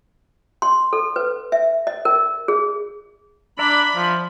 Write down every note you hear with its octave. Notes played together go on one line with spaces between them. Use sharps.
C6
A4
B4
E5
D#5
A#4
G#4
D4 D5 E5 A#5 B5
F3